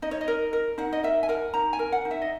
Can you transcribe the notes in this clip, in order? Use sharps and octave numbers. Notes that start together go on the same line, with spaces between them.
D#4 D#5
C#5
D#5
A#4
A#4
D#4 F#5
D#5
A#4 E5
G#5
A#4 F#5
D#4 A#5
G#5
A#4
F#5
D#4
E5
D#5